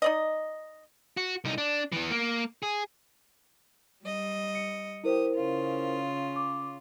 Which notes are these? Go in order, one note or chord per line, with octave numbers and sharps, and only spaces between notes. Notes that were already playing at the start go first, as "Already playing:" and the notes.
D#4 D5 D#5
F#4
C2 D#4
D4
E3 B3
A#3
G#4
G3 D#5
C#7
E4 G4 A#4 C5 D#6
C#3 C#4 F4
D6